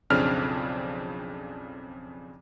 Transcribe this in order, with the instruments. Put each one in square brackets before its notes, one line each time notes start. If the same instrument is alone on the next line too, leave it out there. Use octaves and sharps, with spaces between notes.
[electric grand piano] B1 F2 C#3 C4 D4 F6